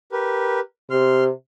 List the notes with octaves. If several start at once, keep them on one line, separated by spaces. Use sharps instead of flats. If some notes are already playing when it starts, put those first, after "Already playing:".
G4 A#4 B4
C3 C6 F6